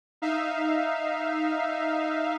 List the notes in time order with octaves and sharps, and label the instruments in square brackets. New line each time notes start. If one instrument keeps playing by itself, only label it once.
[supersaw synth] D#4 E5 F5